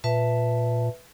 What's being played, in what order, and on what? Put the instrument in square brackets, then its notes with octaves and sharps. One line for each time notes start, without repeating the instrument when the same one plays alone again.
[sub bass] A#2 [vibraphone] B4 E5 A5